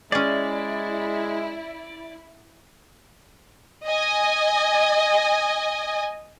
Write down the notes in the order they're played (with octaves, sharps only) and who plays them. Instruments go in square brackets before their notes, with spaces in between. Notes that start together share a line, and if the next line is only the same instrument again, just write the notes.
[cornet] G#3 [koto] C#4 G#4 [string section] E4 [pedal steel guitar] D5
[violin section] D#5 G#5